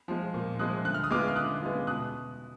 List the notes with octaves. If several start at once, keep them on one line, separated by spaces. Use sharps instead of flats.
F3 G#3
A#2
F3 G#3 D#6 F#6
D3 F#6
F6
D#6
G#3 B3 F4 D6 F6
F6
D3 D#6 F#6
G#3 B3 F4
B2 D#6 F#6